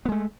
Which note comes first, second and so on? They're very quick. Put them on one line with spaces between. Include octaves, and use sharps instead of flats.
B3 G#3 A3